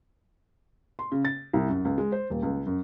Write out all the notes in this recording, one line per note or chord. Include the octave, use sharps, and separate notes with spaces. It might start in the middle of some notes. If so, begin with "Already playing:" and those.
C6
C#3
A6
C2
F#2
C#2
G#3
C5
D#1
C#2
F#2